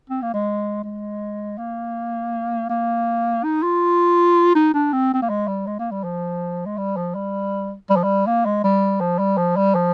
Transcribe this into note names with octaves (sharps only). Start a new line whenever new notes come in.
C4
A#3
G#3
G#3
A#3
A#3
D#4
F4
D#4
D4
C4
C4
A#3
G#3
G3
G#3
A#3
G3
F3
G#3
G3
F3
G3
G3
F3
G3
A#3
G#3
G3
F3
G3
F3
G3
F3